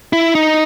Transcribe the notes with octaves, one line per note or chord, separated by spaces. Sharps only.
E4
D#4